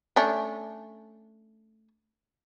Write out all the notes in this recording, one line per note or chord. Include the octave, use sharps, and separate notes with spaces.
A3 C#4 D4